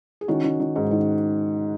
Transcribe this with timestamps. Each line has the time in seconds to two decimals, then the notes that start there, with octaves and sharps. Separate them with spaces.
0.21 G#4
0.28 D#3 C#4 F#4
0.44 D#3
0.60 D#3
0.76 G#2
0.91 D#3